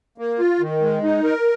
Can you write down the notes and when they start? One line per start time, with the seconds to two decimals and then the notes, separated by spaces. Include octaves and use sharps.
0.18 A#3
0.39 F4
0.60 D#3
0.81 G#3
1.04 D#4
1.24 A#4